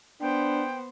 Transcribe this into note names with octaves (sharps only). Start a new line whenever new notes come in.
B3 D4 C5 G5